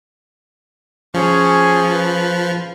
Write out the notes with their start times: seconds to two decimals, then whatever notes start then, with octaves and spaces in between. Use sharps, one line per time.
1.14 F3 C#4 G#4
1.92 B4